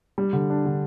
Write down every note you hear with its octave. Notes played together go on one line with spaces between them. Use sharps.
G3
D3
D4
D3